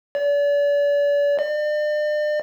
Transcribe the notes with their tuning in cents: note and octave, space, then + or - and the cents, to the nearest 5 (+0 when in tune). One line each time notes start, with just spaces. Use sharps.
D5 -40
D5 +40